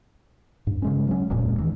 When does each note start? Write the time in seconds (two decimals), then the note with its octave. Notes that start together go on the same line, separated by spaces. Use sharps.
0.67 G2
0.82 C#3 G#3 C#4
1.07 F#3 C#4
1.30 D1 F2 A#2 G#3
1.58 D#3 E3